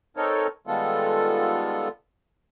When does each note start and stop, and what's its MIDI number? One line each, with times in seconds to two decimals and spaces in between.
0.17 0.47 60
0.17 0.47 63
0.17 0.47 69
0.17 0.47 70
0.17 0.47 73
0.67 1.88 51
0.67 1.88 55
0.67 1.88 56
0.67 1.88 59
0.67 1.88 65
0.67 1.88 69